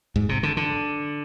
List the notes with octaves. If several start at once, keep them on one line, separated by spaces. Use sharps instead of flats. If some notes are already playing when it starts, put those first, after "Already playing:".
G#2
C3
D3
D3